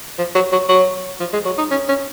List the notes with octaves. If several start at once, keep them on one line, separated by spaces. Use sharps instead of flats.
F3
F#3
F#3
F#3
F3
G#3
F#3
D#4
C#4
C#4